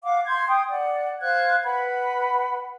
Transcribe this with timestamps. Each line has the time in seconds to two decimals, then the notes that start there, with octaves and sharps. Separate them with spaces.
0.03 F5 F#5 D6
0.26 C6 G6 G#6
0.48 G5 D#6
0.69 D5 F#5
1.21 C5 F5 F#6 G#6
1.64 B4 F#5 B5